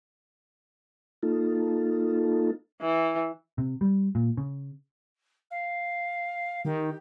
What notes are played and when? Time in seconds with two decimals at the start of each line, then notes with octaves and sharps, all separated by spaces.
1.23 A#3 D#4 F4 A4
2.81 E3
3.58 C3
3.81 G3
4.15 A#2
4.37 C#3
5.51 F5
6.65 D#3 G4